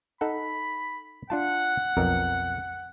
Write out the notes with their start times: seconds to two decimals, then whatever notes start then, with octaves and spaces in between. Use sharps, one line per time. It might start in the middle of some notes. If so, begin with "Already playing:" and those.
0.21 D#4 A4 F#5 B5
1.30 D4 F4 F#5 A5
1.97 B1 F2 A#4